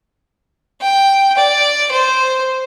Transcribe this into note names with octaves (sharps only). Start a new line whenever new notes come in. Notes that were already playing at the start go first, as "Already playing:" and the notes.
G5
D5
C5